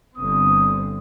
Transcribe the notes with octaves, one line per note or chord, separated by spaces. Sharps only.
G1 D3 C4 D#6